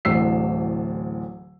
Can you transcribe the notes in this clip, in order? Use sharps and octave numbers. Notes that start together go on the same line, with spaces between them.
D1 A1 D2 E6 C7